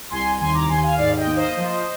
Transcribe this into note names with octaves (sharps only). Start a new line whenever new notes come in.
C2 G#5 C6
D#2 G#5 C6
A#5 D6
D#2 G#5 C6
F5 G#5
G#2 D5 F5
D#5 G5
A#3
C5 D#5
F3